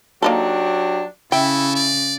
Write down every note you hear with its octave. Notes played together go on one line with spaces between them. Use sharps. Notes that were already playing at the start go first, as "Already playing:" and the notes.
F#3 A#3 D4 D#4 G4 A4
C#3 E4 A4 G5
D5